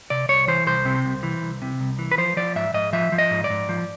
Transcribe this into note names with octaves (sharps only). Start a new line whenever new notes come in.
C3 D5
C2 C#5
E3 C5
C2 C5
C3
C2
E3
C2
C3
C2
E3
B4
F3 C5
F3 D5
G#2 E5
G#2 D#5
F3 E5
F3
D#5
G#2
D5
G#2
F3